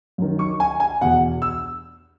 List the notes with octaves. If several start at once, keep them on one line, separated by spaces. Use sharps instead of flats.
F#2 D#3
C#6
G#5
G#5
E2 B2 F#5
E6